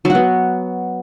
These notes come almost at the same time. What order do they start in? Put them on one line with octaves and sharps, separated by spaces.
F#3 F#4 B3